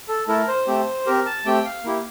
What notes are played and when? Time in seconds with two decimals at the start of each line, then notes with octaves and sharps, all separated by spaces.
0.08 A4
0.28 A3 E4 A4 A#4
0.48 C5
0.67 A3 C4 G4
1.06 C4 G4 A#4
1.26 A5
1.45 A3 C4 G4 G5
1.65 F5
1.84 A#3 E4 G4